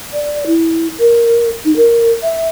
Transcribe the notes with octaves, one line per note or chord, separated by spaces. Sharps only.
D5
E4
A#4
D#4
A#4
E5